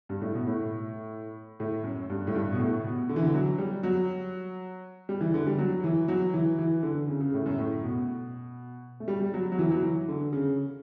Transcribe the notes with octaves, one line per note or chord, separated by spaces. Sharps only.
G2
A2
B2
A2
A2
F#2
G2
A2
G2
B2
A2
B2
D3
E3
D3
F#3
G3
F#3
G3
E3
D3
G3
F#3
E3
F#3
E3
E3
D3
C#3
C#3
A2
F#2
A2
B2
A3
G3
G3
F#3
F#3
E3
F#3
E3
D3
C#3